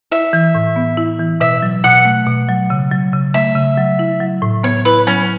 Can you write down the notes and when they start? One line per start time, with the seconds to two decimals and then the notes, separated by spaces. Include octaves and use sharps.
0.12 E4 E5
0.33 E3
0.55 A2
0.76 B3
0.97 E4
1.19 E3
1.40 B2 E5
1.62 F#3
1.84 B2 F#5
2.05 A3
2.27 B2
2.48 F#3
2.70 C#3
2.92 F#3
3.13 C#3
3.34 A3 E5
3.55 C#3
3.77 F#3
3.99 E4
4.20 F#3
4.42 A2
4.63 B3 C#5
4.85 E4 B4
5.07 F#3 C#4